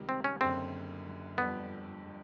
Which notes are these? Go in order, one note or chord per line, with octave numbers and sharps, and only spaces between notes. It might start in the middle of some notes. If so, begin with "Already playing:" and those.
Already playing: C#2 C3 D#3 G3
C4
C#4
F#1 F#2 D3 C4
G1 F2 D3 G3 B3